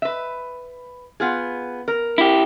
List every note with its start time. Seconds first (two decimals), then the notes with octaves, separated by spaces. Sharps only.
0.02 B4 E5
1.20 B3 F4 G#4
1.88 A#4
2.18 E4 G4